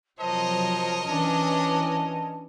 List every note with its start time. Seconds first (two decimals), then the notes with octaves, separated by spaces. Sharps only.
0.19 C3 F3 F#3 A#4 C5 C#5 D#5 A5
1.06 E3 C#4 D4